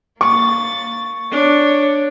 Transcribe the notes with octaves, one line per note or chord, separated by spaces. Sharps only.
A#3 C#6 A6
D4 C#5